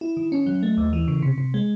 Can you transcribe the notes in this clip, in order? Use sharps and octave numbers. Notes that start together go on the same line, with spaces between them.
E4
D#3
C#4
F#3
A3
D#2
E3
C#3
C3
C3
G#3